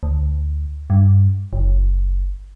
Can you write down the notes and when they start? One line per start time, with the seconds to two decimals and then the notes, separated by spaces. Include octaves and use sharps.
0.03 D2
0.90 G2
1.53 F#1